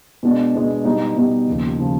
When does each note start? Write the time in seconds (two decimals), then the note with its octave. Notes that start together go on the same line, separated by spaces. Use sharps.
0.23 B2 G#3 B3 D4
0.55 B2 G#3 B3 D4
0.85 B2 G3 B3 D#4
1.16 B2 G3 B3 D#4
1.47 D#2 C#3 F3
1.79 C#3 F3